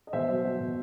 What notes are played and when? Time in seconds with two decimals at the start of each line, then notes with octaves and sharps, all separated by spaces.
0.07 D#5
0.13 B2 C5 E5
0.29 F#3
0.45 F#3
0.60 B2